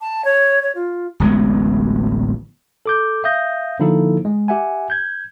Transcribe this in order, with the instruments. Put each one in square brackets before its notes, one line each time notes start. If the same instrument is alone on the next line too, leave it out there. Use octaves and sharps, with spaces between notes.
[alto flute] A5
C#5
C#5
F4
[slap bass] D1 A1 G#3 B3
[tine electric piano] A4 D6 G6
E5 F5 D#6 G6 A#6
D3 F3 A#3 D#4 E4 A4
G#3
G4 E5 F#5 G#5
G6 G#6